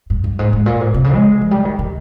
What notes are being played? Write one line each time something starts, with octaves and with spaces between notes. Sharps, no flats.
G2
G2
G#2
G#2
A#2
G#2
C3
C#3
G#3
F3
G3
D#3
D#3